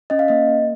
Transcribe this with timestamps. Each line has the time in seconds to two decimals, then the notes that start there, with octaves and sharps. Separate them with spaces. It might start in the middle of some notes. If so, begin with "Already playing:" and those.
0.10 C#4 D#5
0.19 F5
0.28 A#3 D#5
0.49 A#3